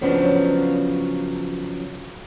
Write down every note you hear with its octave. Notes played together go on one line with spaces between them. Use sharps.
C#3 F3 F#3 B3 C#4 D4